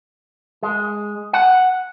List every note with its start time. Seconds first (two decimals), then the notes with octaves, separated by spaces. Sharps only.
0.63 G#3
1.33 F#5